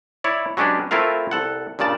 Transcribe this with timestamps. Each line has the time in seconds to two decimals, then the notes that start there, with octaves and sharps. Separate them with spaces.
0.24 E4 C#5 D5
0.57 F#3 G#3 C#4 D4 G4 B4
0.91 A3 C4 E4 F4 A#4 F5
1.31 C2 A4 F#5
1.79 G2 A#2 C#3 D5 A5